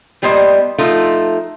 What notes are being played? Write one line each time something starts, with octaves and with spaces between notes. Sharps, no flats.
A2 G3 A#3 B3 C5 D#5
F3 A3 D#4 F4